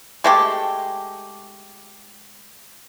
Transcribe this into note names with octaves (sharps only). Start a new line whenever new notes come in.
G#3 A3 G4